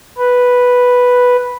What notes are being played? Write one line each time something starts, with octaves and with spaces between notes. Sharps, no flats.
B4